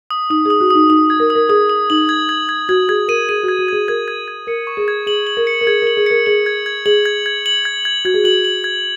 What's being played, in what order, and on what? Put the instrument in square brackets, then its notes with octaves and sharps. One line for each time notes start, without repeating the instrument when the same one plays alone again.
[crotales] D#6
[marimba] D#4 [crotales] D#6
[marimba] G#4 [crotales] D#6
[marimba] F#4
[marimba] D#4 [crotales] D#6
[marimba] D#4 [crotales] D#6
[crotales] G#6
[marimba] A#4
[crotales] D#6
[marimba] A#4
[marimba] G#4 [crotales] D#6
[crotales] D#6
[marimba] D#4 [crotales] F#7
[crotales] G#6
G#6
G#6
[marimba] F#4 [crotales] G#6
[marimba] G#4 [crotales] G#6
[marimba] A#4 [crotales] D#7
[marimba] G#4 [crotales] D#7
[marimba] F#4
[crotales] G#6
[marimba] F#4
[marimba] G#4 [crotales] G#6
[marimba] A#4 [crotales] G#6
[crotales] G#6
G#6
[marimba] A#4 [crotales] C#7
[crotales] C#6
[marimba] G#4
[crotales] G#6
[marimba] G#4 [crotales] F#7
[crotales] F#7
[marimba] A#4
[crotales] C#7
[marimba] A#4
[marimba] G#4 [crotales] G#6
[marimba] A#4 [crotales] F#7
[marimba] G#4
[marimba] A#4 [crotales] C#7
[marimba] G#4 [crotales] F#7
[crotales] G#6
G#6
[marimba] G#4 [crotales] F#7
[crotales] G#6
G#6
F#7
G#6
G#6
[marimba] F#4 [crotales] G#6
[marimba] G#4
[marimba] F#4 [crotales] F#7
[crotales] F#7
G#6